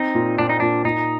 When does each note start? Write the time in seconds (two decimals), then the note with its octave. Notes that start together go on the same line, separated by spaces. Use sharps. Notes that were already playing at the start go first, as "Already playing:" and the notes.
Already playing: C4 D#4
0.14 A#2
0.38 A#2 D4
0.49 D#4
0.60 A#2 D4
0.84 A#2 D#4